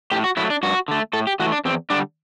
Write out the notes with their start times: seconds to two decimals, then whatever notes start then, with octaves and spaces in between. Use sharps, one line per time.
0.11 A2 G4
0.24 F#4
0.37 F#3 A3 E4
0.50 D4
0.63 G2 F#4
0.88 D3 A3
1.13 A2 A4
1.27 G4
1.40 E3 A3 F#4
1.52 D4
1.65 E2 C4
1.90 D3 G3 D4